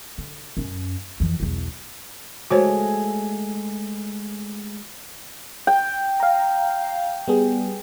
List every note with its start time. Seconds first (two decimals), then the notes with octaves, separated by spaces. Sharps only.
0.18 D3
0.57 F#2 C#4
1.20 F2 E3
1.40 B1 E2
2.50 G#3 A3 F#4 C5 C#5
5.67 G5
6.20 F5 A#5
7.28 G3 B3 G#4